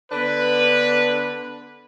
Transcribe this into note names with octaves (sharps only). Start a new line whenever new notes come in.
D3 B3 D4 B4